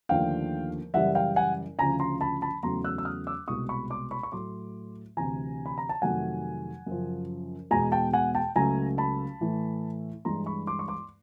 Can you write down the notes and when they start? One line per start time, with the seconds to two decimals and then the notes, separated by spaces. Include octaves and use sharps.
0.09 D#2 D3 F3 A3 F5 G5
0.94 F#2 C#3 E3 G3 E5 F#5
1.15 F5 G5
1.36 F#5 G#5
1.79 D2 C#3 F3 G#5 A#5
2.00 A#5 C6
2.21 A5 B5
2.42 A5 B5
2.63 E2 C#3 F#3 A3 A#5 C6
2.84 E6 F#6
2.98 E6
3.05 D#6 F6
3.27 D6 E6
3.48 C2 B2 G#3 C#6 D#6
3.69 B5 C#6
3.90 C6 D6
4.11 B5 C#6
4.23 C#6
4.32 A2 F#3 A3 C6 D6
5.17 D2 C3 E3 G#5 A#5
5.66 B5
5.78 A#5
5.89 A5
6.02 F2 C3 D#3 F#3 A3 F#5 G#5
6.86 F#2 C#3 F3
7.71 E2 B2 G#3 G#5 A#5
7.92 G5 A5
8.13 F#5 G#5
8.35 G5 A5
8.56 C#2 C#3 F#3 A3 G#5 A#5
8.98 A5 B5
9.41 A2 E3 A3
10.25 G2 E3 G#3 A#5 C6
10.46 B5 C#6
10.67 C6 D6
10.79 C#6
10.88 C6 D6